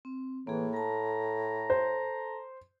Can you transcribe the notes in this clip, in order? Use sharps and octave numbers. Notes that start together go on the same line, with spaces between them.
C4
A2 E3 A#3 G#4
A4 A5 A#5
C5